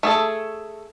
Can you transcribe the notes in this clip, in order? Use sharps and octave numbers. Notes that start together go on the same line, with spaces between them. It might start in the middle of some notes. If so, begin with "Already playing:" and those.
A3 G#4 A4